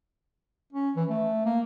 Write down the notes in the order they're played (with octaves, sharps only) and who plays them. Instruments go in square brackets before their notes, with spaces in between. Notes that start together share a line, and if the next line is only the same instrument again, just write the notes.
[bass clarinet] C#4
E3
A3
A#3